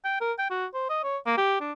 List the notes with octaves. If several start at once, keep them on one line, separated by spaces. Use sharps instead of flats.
G5
A#4
G5
F#4
C5
D#5
C#5
A#3
G4
D4